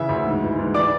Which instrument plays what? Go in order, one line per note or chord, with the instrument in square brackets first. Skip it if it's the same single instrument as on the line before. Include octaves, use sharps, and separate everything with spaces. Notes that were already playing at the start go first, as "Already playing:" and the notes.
Already playing: [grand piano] C#3 E3 E5
D2
G#2
E3
G#2
E3 D5 D6